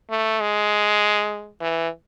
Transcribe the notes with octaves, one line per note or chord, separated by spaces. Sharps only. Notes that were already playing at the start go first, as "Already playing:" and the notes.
A3
G#3
E3